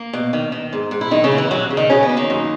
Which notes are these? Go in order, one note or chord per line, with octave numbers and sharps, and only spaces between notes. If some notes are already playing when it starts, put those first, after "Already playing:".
Already playing: A#3
B2
D#3
D#3
G#2
G#2
E4
F#2 D#3 D#4
C#3 C#4
A#3
E3 E4
D#2 F#3 F#4
C#3
D#3 D#4
C#3 F#3 C#4
B3
A#3
D#3 D#4
F#2